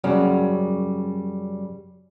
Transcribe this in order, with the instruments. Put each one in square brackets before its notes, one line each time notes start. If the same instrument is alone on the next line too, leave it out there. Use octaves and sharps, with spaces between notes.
[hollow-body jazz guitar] F#2 C#3 F#3 G3